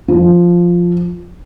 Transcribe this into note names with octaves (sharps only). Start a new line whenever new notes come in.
F3